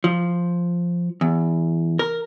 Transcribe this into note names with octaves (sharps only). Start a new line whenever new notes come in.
F3
E2
A#4